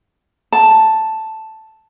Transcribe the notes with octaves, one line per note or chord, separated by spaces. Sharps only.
A5